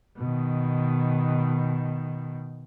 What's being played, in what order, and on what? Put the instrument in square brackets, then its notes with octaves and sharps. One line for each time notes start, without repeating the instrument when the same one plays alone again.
[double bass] B2 D#3